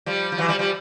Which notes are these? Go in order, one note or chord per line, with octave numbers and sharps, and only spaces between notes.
F3 G3
F3
E3 F#3
F3 G3
F3 G3